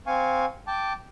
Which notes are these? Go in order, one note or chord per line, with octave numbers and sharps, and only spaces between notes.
C4 F5 G#5 C#6
G5 A5 D6